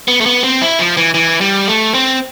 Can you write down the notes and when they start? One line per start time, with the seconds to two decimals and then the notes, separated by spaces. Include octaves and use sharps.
0.08 B3
0.21 A3
0.26 B3
0.44 C4
0.61 E4
0.79 F3
0.97 E3
1.14 E3
1.41 G3
1.68 A3
1.94 C4